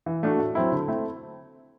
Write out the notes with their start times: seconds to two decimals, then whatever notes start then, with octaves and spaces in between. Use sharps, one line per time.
0.06 E3
0.23 A3 D4 F#4
0.39 A2
0.55 F#3 C4 E4
0.72 D3
0.88 A3 C4 E4